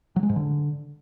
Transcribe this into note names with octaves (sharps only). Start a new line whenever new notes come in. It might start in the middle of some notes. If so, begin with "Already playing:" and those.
F#3
G#3
G#2
D3